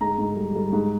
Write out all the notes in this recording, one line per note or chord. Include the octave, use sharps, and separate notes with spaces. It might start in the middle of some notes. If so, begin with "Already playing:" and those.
G#2 A#5
G#2
G3
G3
G#2